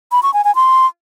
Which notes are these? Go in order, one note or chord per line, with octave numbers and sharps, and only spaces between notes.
B5
C#6
G#5
G#5
C6